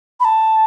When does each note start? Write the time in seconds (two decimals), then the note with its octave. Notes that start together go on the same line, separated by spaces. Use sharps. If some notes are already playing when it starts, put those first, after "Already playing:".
0.20 B5
0.25 A5